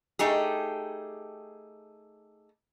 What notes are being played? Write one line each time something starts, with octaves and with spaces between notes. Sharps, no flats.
A3 D#4 G4 G#4